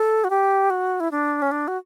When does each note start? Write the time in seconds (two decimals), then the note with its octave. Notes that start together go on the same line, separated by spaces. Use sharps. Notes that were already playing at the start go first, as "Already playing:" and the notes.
Already playing: A4
0.24 F#4
0.30 G4
0.70 F#4
1.00 E4
1.11 D4
1.42 C#4
1.51 D4
1.68 F#4